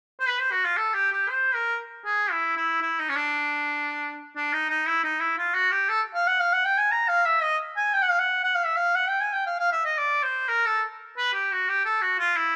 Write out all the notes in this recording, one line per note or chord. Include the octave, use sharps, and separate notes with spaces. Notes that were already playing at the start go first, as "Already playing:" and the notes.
C5
B4
C5
F#4
F4
A4
G4
G4
C5
A#4
G#4
E4
E4
E4
D#4
C#4
D4
D4
D#4
D#4
E4
D#4
E4
F4
F#4
G4
A4
F5
F#5
F5
F#5
G5
G#5
A#5
F5
E5
D#5
G#5
G5
F#5
F5
F#5
F#5
F5
E5
F5
F#5
G5
G#5
G5
F5
F5
E5
D#5
D5
C5
A#4
A4
B4
G4
F#4
G4
A4
F#4
F4
E4